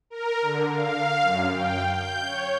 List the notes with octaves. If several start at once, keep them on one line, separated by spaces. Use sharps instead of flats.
A#4
D3
F5
F#2
G5
G6
C#5